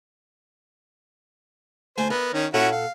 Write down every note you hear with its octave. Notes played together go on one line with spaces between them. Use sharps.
D2 A3 C5 G#5
B3 A#4 D5 E5
D#3 C#4
A#2 C#4 E4 F#4 A4 F#5
F5